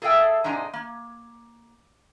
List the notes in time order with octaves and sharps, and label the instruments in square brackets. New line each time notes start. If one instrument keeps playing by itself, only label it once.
[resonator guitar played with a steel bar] G#4 A4 E5 F5 G5
G#2 C3 G#3 D4 D#4 A#5
A#3